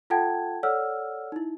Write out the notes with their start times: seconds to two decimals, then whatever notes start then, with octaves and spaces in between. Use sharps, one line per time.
0.10 F4 A4 F#5 G5 A5 G#6
0.63 A4 C#5 D5 F#5 E6 F6
1.32 D#4 E4